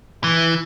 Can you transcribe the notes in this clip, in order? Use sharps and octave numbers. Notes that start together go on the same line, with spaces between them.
E3